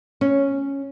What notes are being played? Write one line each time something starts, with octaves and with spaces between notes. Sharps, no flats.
C#4